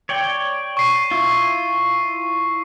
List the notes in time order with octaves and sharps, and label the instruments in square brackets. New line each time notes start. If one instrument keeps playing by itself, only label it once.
[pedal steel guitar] C#5 D5 G5
[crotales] C#6 C7 D#7
[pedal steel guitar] E4 F4